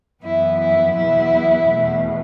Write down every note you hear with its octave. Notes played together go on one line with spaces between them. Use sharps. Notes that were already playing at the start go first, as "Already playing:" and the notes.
F#2 E3 B3 E4
E4
E2 B2 F#3 B3 E4
E2 B2 A3